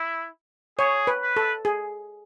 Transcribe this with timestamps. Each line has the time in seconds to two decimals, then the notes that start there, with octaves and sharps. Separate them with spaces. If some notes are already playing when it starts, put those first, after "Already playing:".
Already playing: E4
0.78 G#4 C#5
1.07 B4
1.22 B4
1.37 A4
1.65 G#4